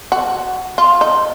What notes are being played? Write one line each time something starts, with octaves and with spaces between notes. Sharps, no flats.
F#4
F4
D#4